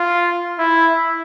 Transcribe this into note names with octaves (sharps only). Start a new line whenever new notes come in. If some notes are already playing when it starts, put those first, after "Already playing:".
Already playing: F4
E4